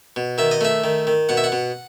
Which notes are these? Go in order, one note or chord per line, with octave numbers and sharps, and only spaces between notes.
B2
D#3 E5
D#5
A3 E5
D#3
D#3
B2 F#5
E5
F#5
B2